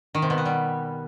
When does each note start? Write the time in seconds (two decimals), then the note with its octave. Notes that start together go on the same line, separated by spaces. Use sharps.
0.15 D#3
0.22 C3
0.30 B2
0.38 B3
0.45 G3